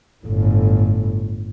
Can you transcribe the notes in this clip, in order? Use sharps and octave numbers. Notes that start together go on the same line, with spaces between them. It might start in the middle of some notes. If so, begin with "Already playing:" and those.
G1 A2